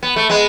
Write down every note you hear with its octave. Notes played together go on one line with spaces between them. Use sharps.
B3
A3
G#3 B3